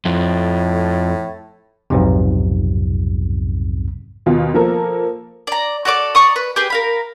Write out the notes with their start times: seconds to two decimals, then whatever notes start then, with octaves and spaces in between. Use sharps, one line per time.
0.05 F2 A2
1.90 B1 F2 G#2 C3
4.26 D#2 B2 F4
4.54 F3 A#3 A4 A#4
5.47 D5 A#5
5.85 F#4 A4 D5 D6
6.15 D5 A#5 C#6 D#6
6.36 B4
6.56 G4 G#4 B4
6.70 A#4 F5 B5